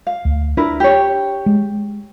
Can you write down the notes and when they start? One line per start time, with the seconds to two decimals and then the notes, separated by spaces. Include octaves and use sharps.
0.07 F5
0.25 D2
0.57 D4 E4 A#4 B4
0.80 G4 C#5
1.46 G#3